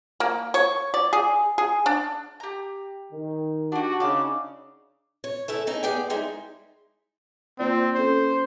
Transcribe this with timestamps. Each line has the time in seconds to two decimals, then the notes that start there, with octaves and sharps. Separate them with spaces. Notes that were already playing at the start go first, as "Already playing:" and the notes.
0.20 A#3
0.54 C#5
0.94 D5
1.13 G#4
1.58 G#4
1.86 D4
2.40 G4 A#5
3.12 D#3
3.72 D4 F#4 G4
4.00 C#3 D4 D#4 D6 E6
5.24 C#5
5.48 A3 C#4 E4
5.67 C#4 D#4 G#4
5.83 B3 G4 G#4 D5 G5
6.10 G3 G#3 D#4 E4
7.59 A#3 C4 F4 D5
7.96 C#4 A4 C5